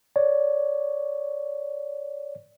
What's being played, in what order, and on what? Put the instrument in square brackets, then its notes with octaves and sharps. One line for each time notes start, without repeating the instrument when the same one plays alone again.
[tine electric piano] C#5 D5